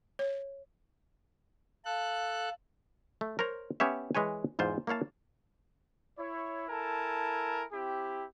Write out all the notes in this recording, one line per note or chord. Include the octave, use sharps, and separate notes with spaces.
C#5
A4 F5 F#6
A3
A#4 C5 C#5 A#5
B3 C#4 G4 C#5 E5
E3 G#3 B4 C#5 G#5
E2 G#2 F4 C5
A#3 E4 C#5 F5 A5
E4 C#5
E4 A4 A#4 G#5 A5
C4 E4 G4